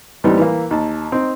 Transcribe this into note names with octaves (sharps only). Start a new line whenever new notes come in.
D#2 A2 E3 G3 B3 C4
E3 A#3
D#2 A5
C4 D#4